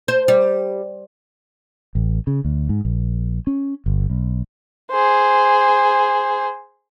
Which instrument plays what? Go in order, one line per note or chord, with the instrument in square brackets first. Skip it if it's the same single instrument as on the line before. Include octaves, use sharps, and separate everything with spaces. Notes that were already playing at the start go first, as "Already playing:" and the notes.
[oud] C5
G3
[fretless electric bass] A1
C#3
D2
G#2
A#1
C#4
G1
B1
[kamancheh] G#4 C5